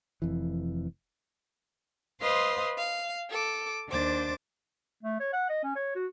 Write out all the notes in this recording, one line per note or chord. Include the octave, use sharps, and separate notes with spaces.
F1 F2 E3
B4 C5 D#5 F5 C6
F5
A4 D6
D#2 D4 C5 D6 A6
A3
C#5
F#5
D#5
C#4
C#5
F#4